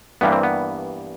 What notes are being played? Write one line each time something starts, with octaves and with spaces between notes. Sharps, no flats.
G2 E3 G3 A#3 B3
C4
B3